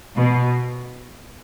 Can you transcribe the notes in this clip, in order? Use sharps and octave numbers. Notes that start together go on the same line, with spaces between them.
B2